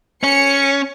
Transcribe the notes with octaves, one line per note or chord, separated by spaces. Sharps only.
C#4 C#7